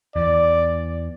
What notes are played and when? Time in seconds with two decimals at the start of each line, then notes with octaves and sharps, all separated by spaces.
0.16 E2 D5